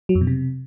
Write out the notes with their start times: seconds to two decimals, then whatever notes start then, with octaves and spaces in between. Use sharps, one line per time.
0.09 F#3
0.15 F2
0.21 B2
0.27 C3